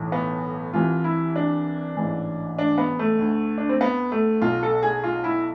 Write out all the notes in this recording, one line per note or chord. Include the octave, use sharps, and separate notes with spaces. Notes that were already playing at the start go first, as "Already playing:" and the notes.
Already playing: B1 A2 E3
B3
C2 C3 E3 F4
E4
D4
A1 G#2 E3
D4
B3
A3
D2 D3
D4
C4
B3
A3
B1 B2 F4
A4
G#4
F4
E4